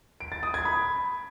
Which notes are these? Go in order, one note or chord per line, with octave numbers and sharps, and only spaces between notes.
D7
A6
D#6
G#6
B5